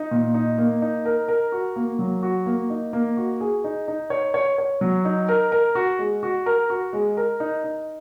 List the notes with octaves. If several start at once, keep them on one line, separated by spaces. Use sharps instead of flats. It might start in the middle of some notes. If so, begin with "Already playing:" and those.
Already playing: D#4
A#2
D#4
A#3
D#4
A#4
A#4
F#4
A#3
F#3
F#4
A#3
D#4
A#3
F#4
G#4
D#4
D#4
C#5
C#5
C#5
F#3
D#4
A#4
A#4
F#4
G#3
F#4
A#4
F#4
G#3
A#4
D#4
D#4